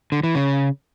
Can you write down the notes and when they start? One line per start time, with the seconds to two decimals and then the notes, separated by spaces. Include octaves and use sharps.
0.12 D3
0.23 E3
0.35 C#3